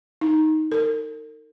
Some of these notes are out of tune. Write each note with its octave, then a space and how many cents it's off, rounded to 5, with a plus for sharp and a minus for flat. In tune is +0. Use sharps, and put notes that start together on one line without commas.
D#4 +10
A#4 -40